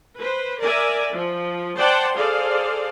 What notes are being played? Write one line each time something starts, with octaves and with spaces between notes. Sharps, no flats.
B4 C5
A#4 D5 E5 G#5
F3
C5 D5 F#5 G5 A5 C6
G#4 A4 C5 D5 F5